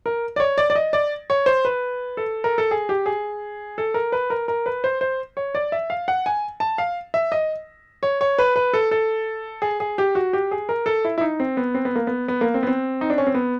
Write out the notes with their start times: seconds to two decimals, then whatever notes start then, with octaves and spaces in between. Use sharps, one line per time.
0.06 A#4
0.36 D5
0.40 C#5
0.58 D5
0.70 D5
0.75 D#5
0.93 D5
1.30 C#5
1.46 C5
1.65 B4
2.17 A4
2.44 A#4
2.58 A4
2.71 G#4
2.89 G4
3.06 G#4
3.78 A4
3.94 A#4
4.12 B4
4.30 A#4
4.48 A#4
4.66 B4
4.84 C5
5.01 C5
5.37 C#5
5.55 D5
5.72 E5
5.90 F5
6.08 F#5
6.26 G#5
6.60 A5
6.78 F5
7.14 E5
7.32 D#5
8.03 C#5
8.21 C#5
8.39 B4
8.56 B4
8.73 A4
8.91 A4
9.62 G#4
9.80 G#4
9.98 G4
10.15 F#4
10.33 G4
10.51 G#4
10.69 A#4
10.86 A4
11.05 E4
11.18 E4
11.21 D#4
11.40 C4
11.57 B3
11.74 C4
11.85 B3
11.95 A#3
12.07 B3
12.28 B3
12.41 A#3
12.54 C4
12.63 B3
12.67 C4
13.01 D#4
13.10 D4
13.18 C#4
13.27 C4
13.34 B3